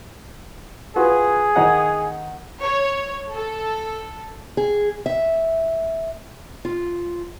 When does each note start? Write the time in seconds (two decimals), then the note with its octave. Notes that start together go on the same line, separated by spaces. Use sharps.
0.96 F4 F#4 G#4 B4
1.56 D#3 D#4 F#5
2.62 C#5
3.32 A4
4.57 G#4
5.06 E5
6.65 F4